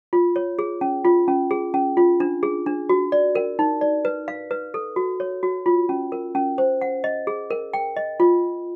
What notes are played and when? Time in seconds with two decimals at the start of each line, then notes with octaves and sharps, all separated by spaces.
0.13 F4
0.36 C#5
0.59 G#4
0.81 C#4
1.05 F4
1.28 C#4
1.51 G#4
1.74 C#4
1.97 F4
2.20 D4
2.43 G#4
2.66 D4
2.89 F#4
3.12 D5
3.35 A#4
3.59 D#4
3.81 D5
4.05 B4
4.28 F5
4.51 B4
4.74 A4
4.96 F#4
5.20 C#5
5.43 F#4
5.66 F4
5.89 C#4
6.12 A#4
6.35 C#4
6.58 C5
6.81 F#5
7.04 D#5
7.27 G#4
7.50 A#4
7.73 G5
7.96 D#5
8.20 F4